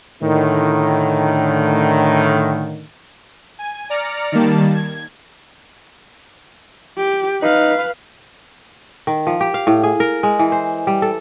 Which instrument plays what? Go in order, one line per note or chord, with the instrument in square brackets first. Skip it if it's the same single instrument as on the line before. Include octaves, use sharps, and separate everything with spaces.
[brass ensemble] A2 D3 D#3
[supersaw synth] G#5
D5 A#5 F6 C#7
D#3 G3 A#3 A5
G#6
[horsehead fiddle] G4
[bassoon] D#4 [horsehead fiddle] B4 F5
[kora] D#3
F3
G4
F5
A2
G#4
A#4
G#3
E3
C5
G3
A4